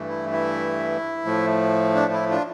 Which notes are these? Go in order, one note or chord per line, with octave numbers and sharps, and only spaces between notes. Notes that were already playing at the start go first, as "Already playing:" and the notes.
Already playing: G2 E3 A3
E4
E4
A2 F3 A3
D4
E4
D4 F4